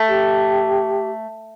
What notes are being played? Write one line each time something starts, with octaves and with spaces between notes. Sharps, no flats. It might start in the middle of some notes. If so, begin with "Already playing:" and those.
Already playing: A3
G4